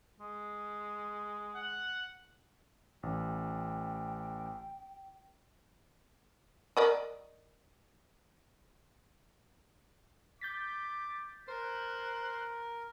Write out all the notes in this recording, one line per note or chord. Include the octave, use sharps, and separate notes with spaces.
G#3
F#5
A1 G5
A#4 D5 D#5
D6 G6 A6 B6
A#4 C5 F#6